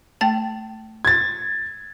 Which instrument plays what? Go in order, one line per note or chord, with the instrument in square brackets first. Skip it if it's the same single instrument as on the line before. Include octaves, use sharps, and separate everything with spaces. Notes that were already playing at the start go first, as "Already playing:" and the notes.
[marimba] A3 G5 A5
[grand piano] G#6 A6